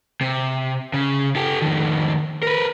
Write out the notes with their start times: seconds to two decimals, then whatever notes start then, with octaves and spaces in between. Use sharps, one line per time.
0.21 C3
0.94 C#3
1.36 G4 A4
1.62 F2 D#3
2.43 A#4 B4